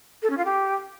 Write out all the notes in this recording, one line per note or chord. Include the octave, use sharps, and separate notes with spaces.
A4
C#4
F4
G4